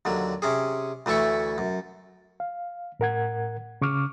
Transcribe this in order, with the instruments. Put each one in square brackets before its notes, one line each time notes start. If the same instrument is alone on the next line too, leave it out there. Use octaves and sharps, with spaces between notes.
[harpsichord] D#2 D3 F#3
C3 C#4 G#4
D2 E3 A3 E4 C#6
F#2
[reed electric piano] F5
A2 A#4 F#5 G#6
C#3 C#6 D6 F6